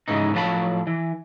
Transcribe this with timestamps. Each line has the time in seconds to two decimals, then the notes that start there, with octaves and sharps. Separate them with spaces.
0.08 G#2 C#3 E3 D#4
0.34 A2 F3 F#3 D#5 A5 B5
0.87 E3